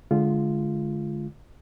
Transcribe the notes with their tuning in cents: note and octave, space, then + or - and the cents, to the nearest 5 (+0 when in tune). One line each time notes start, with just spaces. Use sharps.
D3 +0 G#3 +20 F4 -10